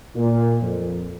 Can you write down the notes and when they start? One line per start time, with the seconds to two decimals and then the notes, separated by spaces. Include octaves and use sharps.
0.16 A#2
0.62 F2